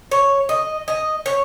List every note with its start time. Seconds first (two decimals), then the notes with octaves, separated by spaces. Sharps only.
0.11 C#5
0.49 D#5
0.88 D#5
1.26 C#5